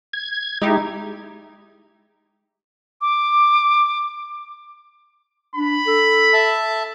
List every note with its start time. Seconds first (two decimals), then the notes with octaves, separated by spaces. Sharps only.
0.13 G#6
0.62 G#3 D#4 E4 G4
3.01 D6
5.56 D4 B5
5.87 A4
6.33 E5 A5